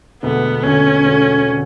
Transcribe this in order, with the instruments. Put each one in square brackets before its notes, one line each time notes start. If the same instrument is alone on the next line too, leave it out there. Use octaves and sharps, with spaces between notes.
[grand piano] E1 D2 D3 [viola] B3
[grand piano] E1 D2 D3 [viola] C#4
[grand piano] E1 D2 D3
D3